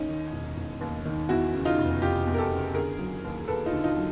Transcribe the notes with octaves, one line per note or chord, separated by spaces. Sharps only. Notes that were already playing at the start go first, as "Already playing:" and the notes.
Already playing: D#2 C#4 D#4
D#3
E1
E1
D#2
D#3
E2 E4 F#4
C#3
D#4 F4
F1
F1 F4 G4
E2
A#4
G4 A4
C#3
D3 G#4 A#4
F#3
D#2
D#2 A4 B4
D#4 F4
D3
D#4 F4
F#3